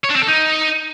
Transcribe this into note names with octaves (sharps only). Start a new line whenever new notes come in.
C#5
D4
C4
A4
D#4